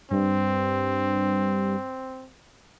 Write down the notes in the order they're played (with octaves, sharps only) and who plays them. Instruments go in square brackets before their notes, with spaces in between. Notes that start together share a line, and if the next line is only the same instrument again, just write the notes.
[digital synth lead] G2 [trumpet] C4